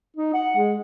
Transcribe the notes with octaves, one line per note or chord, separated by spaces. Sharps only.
D#4
F#5
G#3